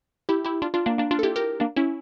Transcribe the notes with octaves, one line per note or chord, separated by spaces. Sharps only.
E4 G4
E4 G4
D4 F4
D4 F4
A#3 D4
A#3 D4
D4 F4
A4
E4 G4
G4 A#4
A#3 D4
C#4 E4